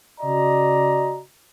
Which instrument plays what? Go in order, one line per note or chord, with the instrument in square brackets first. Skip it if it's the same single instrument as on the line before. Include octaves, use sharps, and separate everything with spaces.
[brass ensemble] C#3 F#4 D5 D#5 A#5